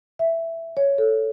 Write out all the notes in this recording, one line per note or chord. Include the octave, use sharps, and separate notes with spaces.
E5
C#5
A4